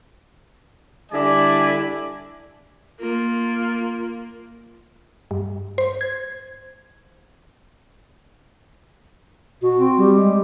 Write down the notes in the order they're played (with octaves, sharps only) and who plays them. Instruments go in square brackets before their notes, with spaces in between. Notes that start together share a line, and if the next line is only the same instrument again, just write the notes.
[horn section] D3 G3 E4 D5 G#5
[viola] A#3 [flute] F4
[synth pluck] G2
C5
G#6
[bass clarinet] B2 [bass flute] F#4
[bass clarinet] C4
[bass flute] G3
[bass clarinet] G#3